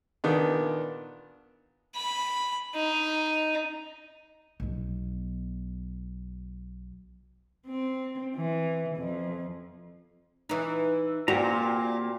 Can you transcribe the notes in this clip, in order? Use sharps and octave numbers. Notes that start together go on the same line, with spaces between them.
A#2 D#3 B3 D4
B5
D#4
B1 B3
C4
E3
F2
E3 D#4
A#2 A#3 C4 F#4 G4 A#5